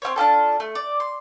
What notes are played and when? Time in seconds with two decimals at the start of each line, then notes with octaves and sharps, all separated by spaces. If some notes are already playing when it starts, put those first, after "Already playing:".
0.02 C4 E4 C5 C#5
0.16 D4 F4 G4 A4
0.60 A3
0.75 D5
1.00 C6